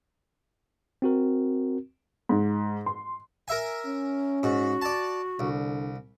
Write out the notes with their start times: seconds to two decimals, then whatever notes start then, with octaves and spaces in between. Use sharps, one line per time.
1.02 C4 F#4 A#4
2.29 G#2
2.86 C6
3.48 A#4 E5 G#5
3.86 C#4
4.43 G#2 F#4
4.82 D5 A5
5.39 C2 D3